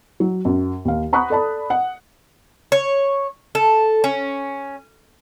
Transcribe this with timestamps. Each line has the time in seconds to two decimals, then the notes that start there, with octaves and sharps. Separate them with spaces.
0.20 F#3
0.45 F#2
0.85 D#2 F5
1.13 F#5 A#5 B5 C#6 D#6 F#6
1.30 A4 D5 A5 B5
1.70 F#5
2.72 C#5
3.55 A4
4.04 C#4